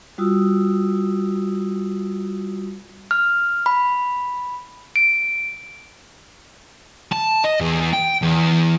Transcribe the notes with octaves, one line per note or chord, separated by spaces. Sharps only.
G3 F4 F#4 D#6 E6
F6
B5
D7
A5
D#5
E2
G5
E2